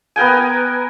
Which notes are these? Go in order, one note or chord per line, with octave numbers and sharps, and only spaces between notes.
B3 A#4 G5 G#5